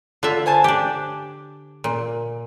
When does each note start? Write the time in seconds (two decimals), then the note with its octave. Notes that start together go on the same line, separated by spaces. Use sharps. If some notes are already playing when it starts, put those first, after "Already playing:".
0.23 D3 F4 E5
0.46 C5 G#5 A5
0.64 D4 G4 D6
1.84 A#2